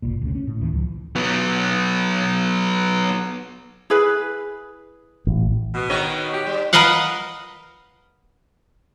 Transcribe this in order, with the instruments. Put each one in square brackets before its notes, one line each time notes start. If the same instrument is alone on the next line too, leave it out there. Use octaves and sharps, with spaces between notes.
[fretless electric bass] F#1 C2 A#2
D2 C#3
C#4
A2
D#2 D#3 E3
C#2 F3
[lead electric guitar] F#3 B3
[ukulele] E4 G#4 B4
[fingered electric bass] A1
[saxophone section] B2
[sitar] D#3 C#5 D#5
[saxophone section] G4
[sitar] G3
[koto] A#4 B4 D#5 F5 F#5